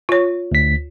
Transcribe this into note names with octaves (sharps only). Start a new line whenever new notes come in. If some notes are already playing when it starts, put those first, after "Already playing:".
F4 C#5
D2 B6